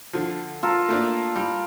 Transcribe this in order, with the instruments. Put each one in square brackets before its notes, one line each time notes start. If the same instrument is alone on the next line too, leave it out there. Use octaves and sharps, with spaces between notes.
[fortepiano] D3 F3
[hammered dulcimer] F4 A4 A#4
[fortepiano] A3 A#3 D4
G3